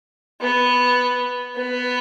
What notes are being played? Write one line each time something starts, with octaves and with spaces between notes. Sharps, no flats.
B3
B3